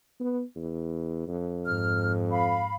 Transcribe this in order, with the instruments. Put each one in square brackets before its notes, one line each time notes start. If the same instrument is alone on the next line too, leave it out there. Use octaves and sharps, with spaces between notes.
[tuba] B3
E2
F2
[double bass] G#2 [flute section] F6
[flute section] F5 B5